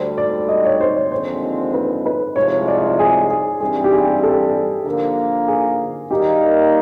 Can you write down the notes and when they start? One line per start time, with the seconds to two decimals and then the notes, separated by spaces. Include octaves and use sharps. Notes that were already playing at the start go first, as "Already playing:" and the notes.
Already playing: D2 D3 G3 C5
0.18 D5
0.49 D#5
0.65 C#5
0.81 C5
0.96 C#5
1.11 D#2 D3 F3 G#3 C4 C5
1.74 B4
2.06 B4
2.36 C2 C3 F3 G#3 C#5
2.68 D5
2.99 G#4
3.30 G#4
3.60 G2 E3 G3 C4 G#4
3.84 G4
3.93 G#4
4.23 A4
4.85 D3 F3 A#3 A#4
5.48 G#4
6.11 D#2 D#3 G3 A#3 D#4 G4